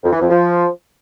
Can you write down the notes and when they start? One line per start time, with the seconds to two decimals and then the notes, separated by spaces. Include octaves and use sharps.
0.03 F2
0.12 E3
0.20 F2
0.29 F3